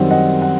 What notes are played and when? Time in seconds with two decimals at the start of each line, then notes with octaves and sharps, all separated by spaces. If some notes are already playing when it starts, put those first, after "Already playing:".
Already playing: F#2 D#3 G3 C4 F#5
0.11 D#5 F#5
0.42 F#5